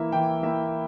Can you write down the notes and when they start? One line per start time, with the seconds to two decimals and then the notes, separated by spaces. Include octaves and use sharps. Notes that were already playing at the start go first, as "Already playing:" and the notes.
Already playing: E3 A#3 E4 E5
0.12 E3 G5
0.43 A#3 E4 E5